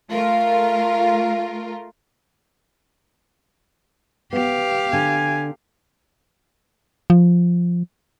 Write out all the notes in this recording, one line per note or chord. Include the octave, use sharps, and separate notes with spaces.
A3 F4 A#4 F5
B3 G4 F5
D3 G#5
F3